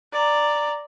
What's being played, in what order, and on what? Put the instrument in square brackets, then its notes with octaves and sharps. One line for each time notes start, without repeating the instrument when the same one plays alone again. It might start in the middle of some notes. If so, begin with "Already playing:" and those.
[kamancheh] D5 A#5